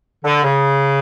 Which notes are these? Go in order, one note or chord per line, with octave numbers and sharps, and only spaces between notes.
D3
C#3